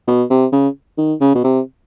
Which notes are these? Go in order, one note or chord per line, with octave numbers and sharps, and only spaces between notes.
B2
C3
C#3
D#3
C#3
B2
C3